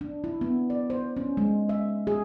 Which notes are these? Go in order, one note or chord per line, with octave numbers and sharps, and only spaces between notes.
D4
E4
B3
D5
C5
C#4
G#3
E5
G#4